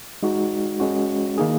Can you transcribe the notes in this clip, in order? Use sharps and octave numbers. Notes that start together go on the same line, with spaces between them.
G#3 D#4 F#4
G#3 C#4 F#4
D#3 A#3 D#4 G#4